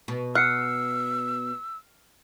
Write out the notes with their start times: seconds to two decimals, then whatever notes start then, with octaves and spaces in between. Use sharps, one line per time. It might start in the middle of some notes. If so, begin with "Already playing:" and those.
0.08 B2
0.35 F#5 E6 F6 C7 C#7